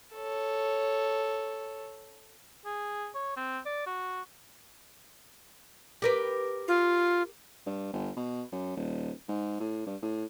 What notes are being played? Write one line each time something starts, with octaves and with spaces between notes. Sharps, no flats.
A4 C#5
G#4
C#5
C4
D5
F#4
G4 A#4 B4
F4
G2
G1
B2
F#2
D#1
G#2
A2
G2
A2